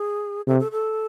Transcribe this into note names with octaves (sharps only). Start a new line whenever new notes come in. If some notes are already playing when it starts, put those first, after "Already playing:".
Already playing: G#4
C3 A4
A4
A4